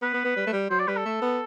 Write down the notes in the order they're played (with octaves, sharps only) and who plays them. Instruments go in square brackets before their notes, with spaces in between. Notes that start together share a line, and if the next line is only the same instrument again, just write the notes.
[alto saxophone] B3 [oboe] B4
[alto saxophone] B3
B3
G3
A3
G3
[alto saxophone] F#3 [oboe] C5
[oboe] D5
[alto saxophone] G3 [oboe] B4
[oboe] A4
[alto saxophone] A3
B3